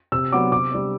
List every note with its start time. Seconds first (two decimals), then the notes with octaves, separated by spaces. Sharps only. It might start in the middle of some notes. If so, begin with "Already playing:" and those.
0.12 C3 E6
0.32 F#3 B3 D4 D6
0.52 C3 D6
0.72 G3 D4